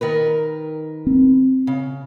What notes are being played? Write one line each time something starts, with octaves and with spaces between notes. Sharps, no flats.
D#3 A#4 B4
C4
C#3